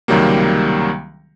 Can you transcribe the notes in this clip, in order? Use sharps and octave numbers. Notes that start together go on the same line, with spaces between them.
C#2 C3 D#3 F#3 G3 A#3